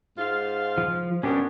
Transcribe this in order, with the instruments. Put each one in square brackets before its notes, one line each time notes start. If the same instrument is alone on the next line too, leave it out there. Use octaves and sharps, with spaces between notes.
[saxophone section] G#2 F4 F5
[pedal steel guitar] F3
[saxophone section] F#2 G3 B3 [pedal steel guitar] C#4 D4 G4